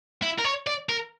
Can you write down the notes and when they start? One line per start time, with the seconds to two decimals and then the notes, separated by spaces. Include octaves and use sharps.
0.22 E4
0.39 A#4
0.45 C#5
0.67 D5
0.89 A#4